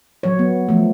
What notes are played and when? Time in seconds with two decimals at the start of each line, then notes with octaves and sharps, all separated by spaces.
0.23 F#3 C#5
0.39 B3
0.69 F3 A3